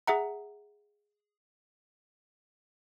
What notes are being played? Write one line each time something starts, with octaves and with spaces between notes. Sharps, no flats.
G#4 E5 F#5 A#5